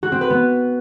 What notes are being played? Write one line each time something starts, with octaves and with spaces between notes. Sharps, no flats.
F#4
C4
B4
B3